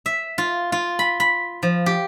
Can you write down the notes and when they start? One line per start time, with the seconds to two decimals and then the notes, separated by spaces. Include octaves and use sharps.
0.06 E5
0.38 F4
0.72 F4
0.99 B5
1.20 B5
1.63 F3
1.86 G4